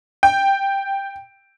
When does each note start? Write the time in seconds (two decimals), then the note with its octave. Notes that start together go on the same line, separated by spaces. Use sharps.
0.23 G5